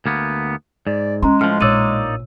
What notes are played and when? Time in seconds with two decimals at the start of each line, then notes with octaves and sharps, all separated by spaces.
0.06 D2 A#3 B3
0.87 G#2 D5
1.23 G#3 C#4 A#5 C6
1.41 A2 F3 F6
1.61 A#1 A2 A#3 D#4 C#5 D5 E6 D#7